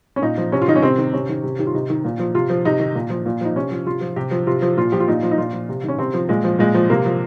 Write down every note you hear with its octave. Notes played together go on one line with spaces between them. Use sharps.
C#4
A#2 D#4
F3
C3 C#4
F4
D#3 D#4
C#4
C3 C4
D#3
C3 C#4
D#3
C3
D#3 G4
F4
C3 D#4
D#3
A#2
F3
C3 F4
F3
C3 D#4
D#3
A#2
F3
A#2
F3 D#4
C3 C#4
F3
C3 F4
F3
C3 G4
F3
C3 F4
F3
A#2 F4
F3 G4
F4
A#2 D#4
F3
D#4
A#2 F4
F3
C3
D#3 C#4
C3 C4
F3
A#2 G#3
F3
A#2 G#3
F3
C3 A#3
F3